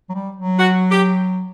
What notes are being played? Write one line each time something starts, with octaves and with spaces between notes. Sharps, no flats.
F#3
G3
F#3
F#4
G4